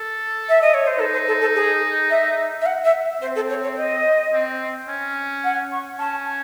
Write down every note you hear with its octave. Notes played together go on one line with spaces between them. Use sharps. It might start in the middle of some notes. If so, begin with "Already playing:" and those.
Already playing: A4
E5
D#5
C#5
C5
D#4 A4
C5
A4
A4
G#4
E5
E5
F#5
E5
C4 C5
A4
C#5
C#5
D#5
C4
C#4
F#5
C#6
C#4 A5